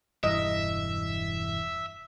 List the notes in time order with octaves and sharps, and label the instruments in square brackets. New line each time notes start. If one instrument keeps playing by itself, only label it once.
[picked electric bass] E1 G2 E3 [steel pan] D#5 [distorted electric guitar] E5